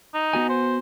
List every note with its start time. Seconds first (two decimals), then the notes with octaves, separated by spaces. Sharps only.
0.14 D#4
0.33 B3 F#4 G#5
0.49 C5